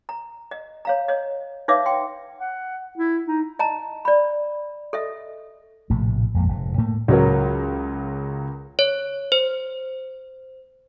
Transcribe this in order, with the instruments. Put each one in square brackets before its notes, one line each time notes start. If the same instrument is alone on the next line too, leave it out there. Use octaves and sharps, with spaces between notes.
[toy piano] A#5
D#5
C#5 F5 A#5
C#5 D#5
D#4 B4 C#5 E5 F5 D6
G5 C6
[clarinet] F#5
E4
D#4
[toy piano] D#5 A5 A#5
D5 B5
A4 D#5 E5
[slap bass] A#1 A2 C3 A3
A#1 F2 G#3 A#3
F1 G#2
A2 A3 A#3
[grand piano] C#2 F#3 A#4
[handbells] C#5
C5